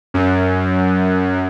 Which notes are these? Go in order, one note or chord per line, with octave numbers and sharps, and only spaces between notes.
F#2